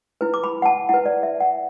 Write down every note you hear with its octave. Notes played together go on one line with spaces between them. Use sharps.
E4 B4
D6
B5
F#5
A5
E4 B4 F#5
D5
E5
F#5